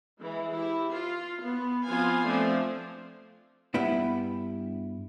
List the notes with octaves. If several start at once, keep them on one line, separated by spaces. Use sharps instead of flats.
E3 G#3 E4
E4 G4
F4
B3
F3 B3 C4 F4 F5 G#5
F3 A3 C4 D4 F4
G2 G3 B3 E4